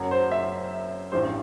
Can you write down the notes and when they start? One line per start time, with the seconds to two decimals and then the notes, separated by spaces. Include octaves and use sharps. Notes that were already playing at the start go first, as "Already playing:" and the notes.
Already playing: F#1 F#2 F#3
0.11 C5
0.32 E5
1.12 A1 G2 E3 G3 C5